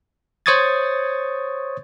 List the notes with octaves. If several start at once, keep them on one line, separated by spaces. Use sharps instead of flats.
C5 C#5 C#6 D#6 G#6 A6